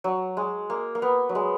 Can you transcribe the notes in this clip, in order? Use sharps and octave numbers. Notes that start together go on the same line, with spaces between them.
F#3
G#3
A#3
A#3
B3
F#3
G#3